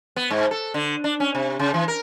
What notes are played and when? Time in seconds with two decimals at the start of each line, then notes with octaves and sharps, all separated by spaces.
0.16 B3
0.30 G#2
0.51 A4
0.74 D3
1.04 D4
1.20 C#4
1.35 C3
1.59 C#3
1.74 E3
1.88 A#4